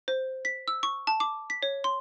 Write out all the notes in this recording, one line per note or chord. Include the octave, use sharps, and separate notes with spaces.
C5
B6
E6
C#6
A5
D6
B6
C#5
C6